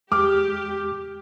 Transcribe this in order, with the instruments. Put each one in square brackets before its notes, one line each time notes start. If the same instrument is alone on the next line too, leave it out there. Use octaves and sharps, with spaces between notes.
[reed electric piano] E2 G#3 [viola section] G4 [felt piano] D6 F6